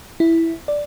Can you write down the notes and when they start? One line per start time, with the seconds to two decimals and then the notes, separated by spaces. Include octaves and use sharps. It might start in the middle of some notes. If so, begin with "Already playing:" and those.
0.20 E4
0.68 D5